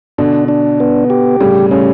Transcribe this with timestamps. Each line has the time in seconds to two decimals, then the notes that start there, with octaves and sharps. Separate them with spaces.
0.18 B2 D3 D4
0.48 D4
0.80 B3
1.10 G4
1.40 A2 C#3 G3
1.71 A2 C#3 C#4